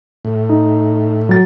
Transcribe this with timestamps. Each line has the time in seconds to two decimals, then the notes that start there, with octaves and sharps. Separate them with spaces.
0.25 A2
0.49 D#4
1.29 F#3 A6